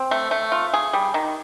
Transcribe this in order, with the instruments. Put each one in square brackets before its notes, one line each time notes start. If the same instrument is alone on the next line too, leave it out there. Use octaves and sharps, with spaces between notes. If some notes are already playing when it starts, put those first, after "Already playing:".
Already playing: [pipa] C4
A3
A3
F4
G#4
G3
D#3